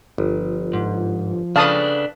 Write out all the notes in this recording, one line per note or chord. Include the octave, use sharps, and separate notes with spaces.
G1 F3
G#2
C#3 D4 A4 B4 F5 A5 D#6